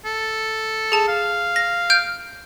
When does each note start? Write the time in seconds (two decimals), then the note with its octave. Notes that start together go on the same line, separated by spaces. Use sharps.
0.05 A4
0.92 G#4 A5
1.08 F5
1.56 A#6
1.90 F6 G6 D7